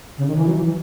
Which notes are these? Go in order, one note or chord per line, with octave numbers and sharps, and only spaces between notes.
C#3
D#3
E3
F#3
E3